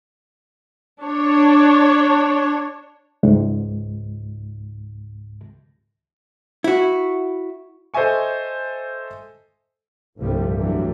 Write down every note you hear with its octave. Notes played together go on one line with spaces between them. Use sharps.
D4 C#5
C#2 G#2
E4 F#4
A4 C5 D#5 E5 G#5 C#6
G1 C2 A2 D3 F3 G3
D2 D3 E3 F#3 G3